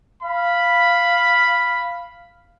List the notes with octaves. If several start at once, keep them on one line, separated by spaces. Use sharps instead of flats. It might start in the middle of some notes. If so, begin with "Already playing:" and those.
F5 B5